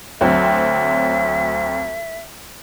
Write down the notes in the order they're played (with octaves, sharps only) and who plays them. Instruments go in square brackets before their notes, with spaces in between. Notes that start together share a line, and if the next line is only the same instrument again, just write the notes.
[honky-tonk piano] D2 F#3 C4 [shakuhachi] E5